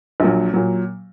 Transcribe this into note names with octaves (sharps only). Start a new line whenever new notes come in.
A#1 A#2 F#3
A#2 F#3